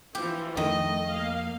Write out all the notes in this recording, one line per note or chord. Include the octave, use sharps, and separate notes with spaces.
E3 F3 G4
F2 D#3 A3 D#5
A#3 F5